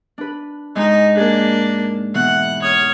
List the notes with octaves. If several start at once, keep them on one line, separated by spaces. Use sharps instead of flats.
D4 B4
G#2 G#3 D#4 A#5
A#3 D4 G#4
B2 E3 F#5
C#5 D#6 F6